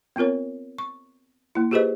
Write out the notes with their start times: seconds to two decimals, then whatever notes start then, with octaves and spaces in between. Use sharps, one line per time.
0.16 B3 C4 F4 A#4 C#5
0.78 C#6
1.55 A#3 E4
1.71 F4 G4 G#4 B4 C5 D#5